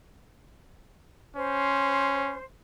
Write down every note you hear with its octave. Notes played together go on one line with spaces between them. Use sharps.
C#4 C5